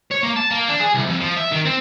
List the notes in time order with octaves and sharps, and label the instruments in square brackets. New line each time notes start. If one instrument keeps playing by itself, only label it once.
[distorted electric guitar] C#5
A#3
A5
A#3
D4
G#4
C2
F2
F3
E5
D#3
C4